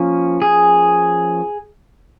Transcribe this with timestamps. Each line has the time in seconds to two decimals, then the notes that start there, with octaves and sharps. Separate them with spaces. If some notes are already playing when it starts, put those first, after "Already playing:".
Already playing: F3 A#3 C#4
0.42 G#4